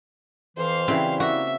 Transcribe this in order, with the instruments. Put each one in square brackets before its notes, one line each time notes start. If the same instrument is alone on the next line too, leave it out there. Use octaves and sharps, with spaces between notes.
[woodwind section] F2 E3 [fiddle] C5 F5
[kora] C#3 E3 [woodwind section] F#3 G3 E4 [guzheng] C4
[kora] A#3 [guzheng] F#4 [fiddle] E5